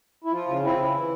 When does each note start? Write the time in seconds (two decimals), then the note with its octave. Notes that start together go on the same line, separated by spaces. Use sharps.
0.24 E4
0.32 F3 F4
0.47 C#3
0.63 C4 E4
0.71 F4
0.78 C#3 E4
0.94 E3